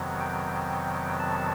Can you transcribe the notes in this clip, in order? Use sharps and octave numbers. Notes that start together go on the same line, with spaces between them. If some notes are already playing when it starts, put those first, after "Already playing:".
Already playing: F2 C3 D#3 F#3 B3
G5
A5